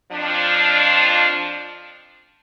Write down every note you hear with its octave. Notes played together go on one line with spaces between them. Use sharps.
F2 F3 D4